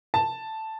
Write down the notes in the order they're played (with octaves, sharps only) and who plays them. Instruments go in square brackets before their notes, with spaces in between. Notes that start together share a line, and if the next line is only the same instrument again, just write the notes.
[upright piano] A5